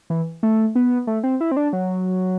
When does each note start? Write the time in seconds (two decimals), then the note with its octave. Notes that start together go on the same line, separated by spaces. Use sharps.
0.10 E3
0.43 A3
0.75 B3
1.07 A3
1.23 C4
1.41 E4
1.52 C4
1.57 D4
1.73 F#3